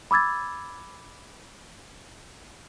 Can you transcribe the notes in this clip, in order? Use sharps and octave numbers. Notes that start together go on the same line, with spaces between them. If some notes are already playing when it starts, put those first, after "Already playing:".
B5 D6 E6 G#6 A6